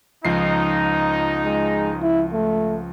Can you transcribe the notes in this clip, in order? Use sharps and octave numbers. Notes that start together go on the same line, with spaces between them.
C#2 F3 D#4 C7
G#3
E4
A3